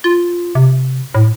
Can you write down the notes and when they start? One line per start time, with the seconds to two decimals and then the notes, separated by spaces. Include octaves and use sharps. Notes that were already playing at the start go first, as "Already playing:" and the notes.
0.04 F4
0.55 C3
1.14 A2